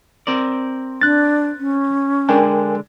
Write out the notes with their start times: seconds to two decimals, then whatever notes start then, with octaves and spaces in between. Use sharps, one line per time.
0.27 C4 A#4 D5
1.01 D4 F#6 A6
1.59 C#4
2.29 D3 G#3 D4 A#4 G5 G#5